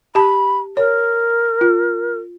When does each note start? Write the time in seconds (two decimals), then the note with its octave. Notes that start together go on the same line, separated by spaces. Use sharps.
0.15 G4 A5 B5
0.77 A#4 C#5
1.61 F4